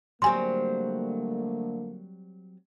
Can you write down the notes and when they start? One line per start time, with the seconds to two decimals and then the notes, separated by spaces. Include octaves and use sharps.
0.22 D3 F#3 G3 A3 A#3 C4 G#5 C6